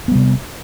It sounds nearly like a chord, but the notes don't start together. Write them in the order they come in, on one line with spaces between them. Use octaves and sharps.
B3 G3 C3